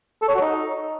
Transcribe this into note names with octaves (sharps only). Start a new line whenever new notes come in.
A4
C#5
F#4
D#4